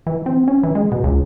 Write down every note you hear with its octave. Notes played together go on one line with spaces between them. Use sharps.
E3
C4
C#4
E3
G#3
B2
C#2